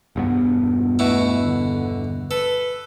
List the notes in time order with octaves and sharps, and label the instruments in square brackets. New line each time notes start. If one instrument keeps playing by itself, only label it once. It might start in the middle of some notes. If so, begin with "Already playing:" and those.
[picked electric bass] E1 G2 B3
[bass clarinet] C#2
[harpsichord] B2 E4 [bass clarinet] A3
[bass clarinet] D3
[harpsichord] A4 [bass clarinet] B4